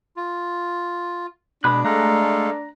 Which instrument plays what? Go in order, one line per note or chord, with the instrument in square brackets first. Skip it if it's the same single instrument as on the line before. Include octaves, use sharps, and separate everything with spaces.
[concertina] F4
[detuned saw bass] B2 [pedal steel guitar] G#3 B5 F#6 [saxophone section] D4
[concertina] G#3 A4 F5 [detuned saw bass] A3 [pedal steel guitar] A#5 F#6